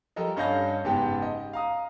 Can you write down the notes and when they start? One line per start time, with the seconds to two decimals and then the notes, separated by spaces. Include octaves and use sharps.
0.16 F3 G3 A4 A#4 D#5
0.37 G2 C#4 D#5 F5 G6 A#6
0.84 F#1 G#2 B3 G4 G5 A5
1.22 D#5
1.53 F5 A#5 D#6